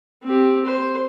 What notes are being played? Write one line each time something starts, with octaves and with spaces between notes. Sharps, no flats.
C4 G4
C5